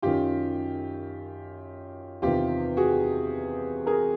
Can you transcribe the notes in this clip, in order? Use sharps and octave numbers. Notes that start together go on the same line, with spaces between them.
F#2 D#3 F4 G4
E2 C3 D#3 F4 G4
F#4 G#4
G#4 A#4